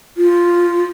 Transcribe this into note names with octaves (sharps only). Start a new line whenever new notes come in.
F4